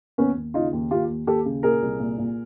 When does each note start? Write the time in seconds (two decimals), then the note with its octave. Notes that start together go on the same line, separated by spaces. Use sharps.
0.18 D#2 B3 C#4
0.36 D#2
0.54 C#3 D#4 F4
0.72 D#2
0.91 D#2 F4 G4
1.09 D#2
1.27 D#2 G4 A4
1.45 C#3
1.63 A#2 G#4 A#4
1.82 C2
2.00 A#2
2.18 A#2